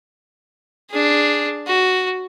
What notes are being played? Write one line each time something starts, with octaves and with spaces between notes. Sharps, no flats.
D4 G#4
F#4